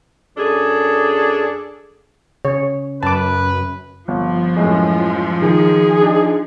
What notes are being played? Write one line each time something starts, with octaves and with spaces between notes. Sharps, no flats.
F#2 D4 G#4 A4
C#3 C#5
F#2 B4 A5 D6
G1 F3
F#2 A2 G#3
D#3 G#4
D4 D#4